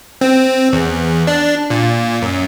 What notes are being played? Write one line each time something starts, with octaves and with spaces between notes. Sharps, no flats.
C4
E2
D4
A#2
F#2